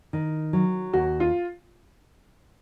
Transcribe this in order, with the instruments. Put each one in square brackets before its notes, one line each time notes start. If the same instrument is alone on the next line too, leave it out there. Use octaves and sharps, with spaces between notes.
[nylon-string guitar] D#3
F#3
[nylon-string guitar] D#2 [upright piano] F#4
[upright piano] F4